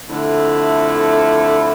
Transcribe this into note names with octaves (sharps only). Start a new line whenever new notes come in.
F2 D3 A3 E4